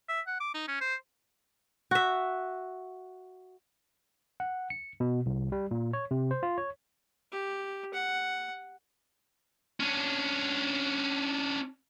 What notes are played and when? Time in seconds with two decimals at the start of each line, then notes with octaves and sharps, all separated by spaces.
0.09 E5
0.27 F#5
0.40 D6
0.54 D#4
0.68 C#4
0.81 C5
1.91 F#4 E5
4.40 F#5
4.70 C#7
5.00 B2
5.26 C2
5.52 G3
5.71 A#2
5.93 C#5
6.11 C3
6.31 C5
6.43 F4
6.58 C#5
7.32 G4
7.93 F#5
9.80 C#4 D4